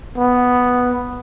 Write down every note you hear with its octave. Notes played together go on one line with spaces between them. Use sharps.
B3